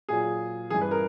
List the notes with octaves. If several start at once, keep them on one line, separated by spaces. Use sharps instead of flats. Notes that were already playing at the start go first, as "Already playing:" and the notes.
A#2 F#3 G#4
G2 E3 G#4
B4
A#4